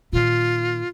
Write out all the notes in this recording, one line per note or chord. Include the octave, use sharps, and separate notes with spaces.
A#2 D#3 F4